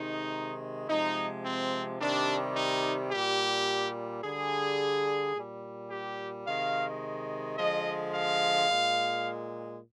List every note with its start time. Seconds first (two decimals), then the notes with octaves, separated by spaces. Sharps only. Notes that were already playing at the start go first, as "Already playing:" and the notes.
Already playing: C3 D#3 G#3 D#4
0.88 C3 F3 G#3 D#4
1.45 C4
2.00 C3 D#3 G3 D4
2.56 D#4
3.11 A#2 G3 G4
4.23 D3 G3 G#4
5.35 A#2 G3
5.90 G4
6.46 C3 D#3 G#3 F5
7.58 D3 F3 G#3 D#5
8.14 F5
8.69 A#2 G#3